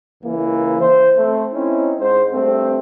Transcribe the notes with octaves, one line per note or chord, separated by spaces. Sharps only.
C#2 E3 A#3
C5
A3 C4
C4 C#4 D#4 E4
G#2 C5
G2 A3 C4